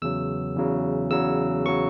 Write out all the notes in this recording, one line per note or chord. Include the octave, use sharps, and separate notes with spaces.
E2 C#3 F#3 E6
E2 C#3 F#3
E2 C#3 F#3 E6
C#3 F#3 C#6